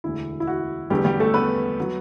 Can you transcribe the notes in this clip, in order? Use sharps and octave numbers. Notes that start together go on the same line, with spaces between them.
E1 D2 D3 E4
E4
F#4
E1 E2 D3 G3 A3 G4
G3 G4
A3 A4
B3 B4
F#3